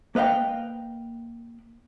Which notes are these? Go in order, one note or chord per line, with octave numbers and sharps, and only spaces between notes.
A#3 B4 D#5 F5 G5